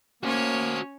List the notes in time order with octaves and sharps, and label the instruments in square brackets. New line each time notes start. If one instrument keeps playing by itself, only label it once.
[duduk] A#3 [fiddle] C#4 C#5 [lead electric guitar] F#4 C5